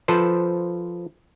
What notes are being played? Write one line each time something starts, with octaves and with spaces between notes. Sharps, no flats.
F3 A4 B4 C5